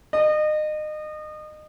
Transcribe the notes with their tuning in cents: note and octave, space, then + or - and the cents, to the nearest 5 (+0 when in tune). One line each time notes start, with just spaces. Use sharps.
D#5 -30